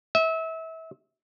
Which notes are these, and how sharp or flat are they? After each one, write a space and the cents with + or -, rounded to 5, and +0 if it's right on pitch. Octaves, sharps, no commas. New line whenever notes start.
E5 -30